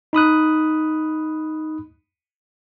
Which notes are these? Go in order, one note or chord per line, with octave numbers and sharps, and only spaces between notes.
D#4 B5 D#6 F#6